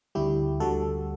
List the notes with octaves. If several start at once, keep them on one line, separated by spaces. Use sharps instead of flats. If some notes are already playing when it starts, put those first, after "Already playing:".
D2 D3 G3 E4 G4
D2 D3 G3 F#4 A4